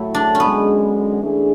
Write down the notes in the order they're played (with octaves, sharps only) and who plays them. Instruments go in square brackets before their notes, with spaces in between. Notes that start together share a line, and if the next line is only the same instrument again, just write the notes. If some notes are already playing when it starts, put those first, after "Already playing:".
Already playing: [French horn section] A2 F#3 A3 [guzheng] E4
[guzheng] D4
C#4
[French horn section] F#2 D3 G#3 [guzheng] B3
[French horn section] E3 A3 D4 G#4